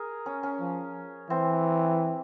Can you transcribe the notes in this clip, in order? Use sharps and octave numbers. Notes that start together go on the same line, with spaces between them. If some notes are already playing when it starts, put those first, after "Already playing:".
Already playing: G#4 A#4
C#4
C#4
F3
E3 C4